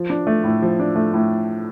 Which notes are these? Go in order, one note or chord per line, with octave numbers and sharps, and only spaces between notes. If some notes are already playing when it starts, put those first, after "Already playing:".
Already playing: F3
D4
A3
A2
F3
D4
A3
A2